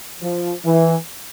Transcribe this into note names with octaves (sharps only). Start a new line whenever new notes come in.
F3
E3